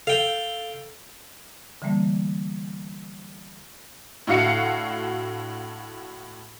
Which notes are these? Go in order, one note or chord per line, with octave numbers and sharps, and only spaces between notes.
A4 F5 G5
D3 E3 G3 A3 A#3
A2 D3 F#4 F5 C#7